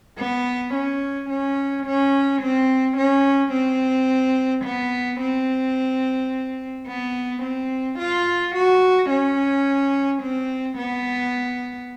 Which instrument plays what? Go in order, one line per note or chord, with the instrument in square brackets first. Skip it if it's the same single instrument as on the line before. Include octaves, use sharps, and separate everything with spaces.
[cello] B3
C#4
C#4
C#4
C4
C#4
C4
B3
C4
B3
C4
F4
F#4
C#4
C4
B3